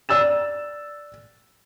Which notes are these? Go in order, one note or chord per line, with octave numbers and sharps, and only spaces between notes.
D5 E6 A6 E7